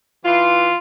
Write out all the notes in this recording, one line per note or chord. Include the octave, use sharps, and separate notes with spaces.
E3 F4